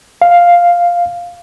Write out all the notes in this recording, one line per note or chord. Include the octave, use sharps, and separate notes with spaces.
F5